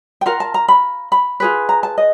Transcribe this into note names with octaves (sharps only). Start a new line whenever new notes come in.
G5
F4 A#4 F#5
A5
A#5
B5
B5
F4 G#4 B4
A#5
A5
D#5